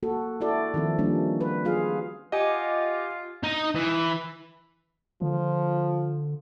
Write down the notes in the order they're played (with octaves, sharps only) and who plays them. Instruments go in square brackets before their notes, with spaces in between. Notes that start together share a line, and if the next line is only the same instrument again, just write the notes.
[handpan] A#3 F#4 A4
E4 F#4 A4 D5
D#3 F3 C4 A4
F3 G3 A#3 C#4 D4
B4
F#3 F4 G#4 F5
[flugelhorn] F4 [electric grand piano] G4 D#5 [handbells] F#5 G#5 D6
[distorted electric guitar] D#4 D#5
E3
[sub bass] D3 [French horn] F3